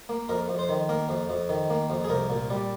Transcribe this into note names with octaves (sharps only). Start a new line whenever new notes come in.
A#3
F2 A#4
F2
C5
D#3
A#3 A#4
F2
F2
D#3
A#3
F2
G#4
C2 A#4
A#2
G3